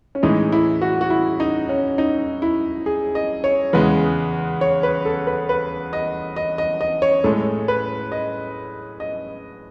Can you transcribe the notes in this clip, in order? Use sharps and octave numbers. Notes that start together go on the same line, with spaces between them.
C#4
A2 E3 G#3 D#4
E4
F#4
F#4
E4
D#4
C#4
D#4
E4
G#4
D#5
C#5
E2 C#3 G#3 B4
C#5
B4
A4
B4
B4
D#5
D#5
D#5
D#5
C#5
A2 G#3 A4
B4
D#5
D#5